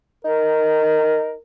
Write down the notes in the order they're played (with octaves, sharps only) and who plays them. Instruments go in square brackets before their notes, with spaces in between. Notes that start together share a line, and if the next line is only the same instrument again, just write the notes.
[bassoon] D#4 [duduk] A#4